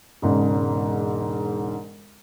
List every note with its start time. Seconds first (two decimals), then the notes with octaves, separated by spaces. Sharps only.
0.22 E1 G#2 C#3